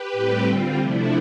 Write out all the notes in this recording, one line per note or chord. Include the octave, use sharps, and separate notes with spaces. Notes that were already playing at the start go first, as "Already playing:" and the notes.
Already playing: G4 B4
A2 G3 C4
D3 G3 C4 F4
C3 F3 A3 D4 E4